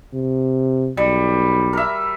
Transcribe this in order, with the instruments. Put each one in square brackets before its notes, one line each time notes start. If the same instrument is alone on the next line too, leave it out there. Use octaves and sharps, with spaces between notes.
[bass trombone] C3
[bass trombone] B1 [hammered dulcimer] G3
[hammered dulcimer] A#4 E5